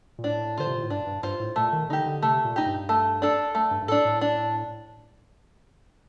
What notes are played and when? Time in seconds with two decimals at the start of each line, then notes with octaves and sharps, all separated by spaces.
0.18 A#2
0.24 A2 D4
0.58 D3 F4 C5
0.67 C3
0.75 A#2
0.83 A2
0.90 G2 D4
1.07 G2
1.23 G2 F4 C5
1.40 A2
1.56 A#2 A3
1.72 D#3
1.89 D3 D#4 G4
2.06 D3
2.22 C3 A3
2.45 A#2
2.56 D#4 G4
2.66 G2
2.89 A3
3.22 D4 A4
3.55 A3
3.71 G2
3.82 G2
3.88 A2 D4 A4
4.05 A2
4.21 D4